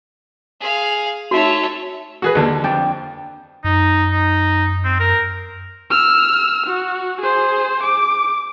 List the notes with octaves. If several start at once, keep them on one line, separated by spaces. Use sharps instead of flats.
G#4 F5
A3 D#4 F#4 C#5
F#4 G#4 B4
D#2 D3
F2 D4 G5
F#2 D#4
D#4
C4
A#4
E6 F6
F#4
G#4 C5
D6